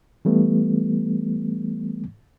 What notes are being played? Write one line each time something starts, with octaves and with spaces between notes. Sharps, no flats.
E3 G3 A3 B3